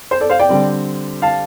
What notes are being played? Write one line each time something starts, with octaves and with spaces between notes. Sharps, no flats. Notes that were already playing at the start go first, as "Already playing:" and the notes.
C5
A4 D5
C5 F5
D5 G5
D3 G3 C4
F5 A5